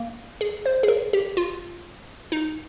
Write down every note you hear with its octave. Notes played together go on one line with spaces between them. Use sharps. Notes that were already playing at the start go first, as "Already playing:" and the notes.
Already playing: A#3
G#4
C5
G#4
A#4
G4
F4
D#4